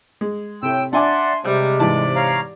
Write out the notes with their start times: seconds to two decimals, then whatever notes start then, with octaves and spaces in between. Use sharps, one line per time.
0.21 G#3
0.63 A2 C3 G5 E6
0.93 D4 D5 E5 F#5 G#5 C6 D6
1.44 C3 G3 G#3
1.80 G#2 E3 D5 A5
2.16 C#5 F5 A#5